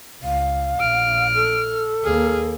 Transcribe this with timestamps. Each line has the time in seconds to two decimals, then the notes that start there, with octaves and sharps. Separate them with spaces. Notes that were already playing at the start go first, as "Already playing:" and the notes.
0.23 C#2 F5
0.80 A#1 F6 D7
1.35 A4
2.04 D#2 A#3 G#4 F6